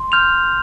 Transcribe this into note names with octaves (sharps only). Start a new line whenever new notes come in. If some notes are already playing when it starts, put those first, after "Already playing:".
Already playing: C6
F6 G6 F7